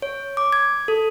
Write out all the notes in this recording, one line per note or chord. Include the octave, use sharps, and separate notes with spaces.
C#5
D6
G#6
A4